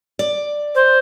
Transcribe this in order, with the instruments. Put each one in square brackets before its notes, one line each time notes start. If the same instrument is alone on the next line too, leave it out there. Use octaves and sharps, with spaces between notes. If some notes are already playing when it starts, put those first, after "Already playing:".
[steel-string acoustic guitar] D5
[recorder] C5